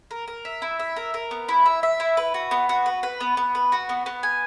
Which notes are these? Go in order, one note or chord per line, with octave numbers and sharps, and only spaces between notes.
A#4
A#4
E5
E4
E5
A#4
A#4
B3
E4
E5
E5
E4
B4
F#4
B3
F#4
B4
B4
B3
B3
B4
F#4
B3
B3
G#5